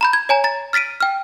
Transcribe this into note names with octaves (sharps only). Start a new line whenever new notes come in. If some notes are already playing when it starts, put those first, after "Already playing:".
A#5 B5 G6
G#6
C#5 G#5 A#5
A#5 A6
F6 A6 B6 D7 D#7
G5 F6